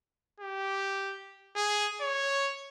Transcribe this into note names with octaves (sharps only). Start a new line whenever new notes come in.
G4
G#4
C#5